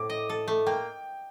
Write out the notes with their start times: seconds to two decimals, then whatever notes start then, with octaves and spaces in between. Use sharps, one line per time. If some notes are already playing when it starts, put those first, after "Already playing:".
Already playing: A2 C4 D6
0.09 D#5
0.29 A4
0.48 A3
0.67 A#3 G5